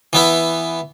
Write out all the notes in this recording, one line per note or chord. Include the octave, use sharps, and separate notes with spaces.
E3 B3 E4